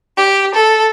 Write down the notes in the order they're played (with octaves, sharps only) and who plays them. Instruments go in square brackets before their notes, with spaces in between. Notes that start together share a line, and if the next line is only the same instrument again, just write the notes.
[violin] G4
A4